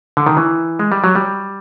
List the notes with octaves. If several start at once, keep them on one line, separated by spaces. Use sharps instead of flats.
D3
D#3
E3
G#3
G3
F#3
G3